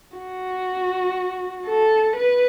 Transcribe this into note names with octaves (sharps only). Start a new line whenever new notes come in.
F#4
A4
B4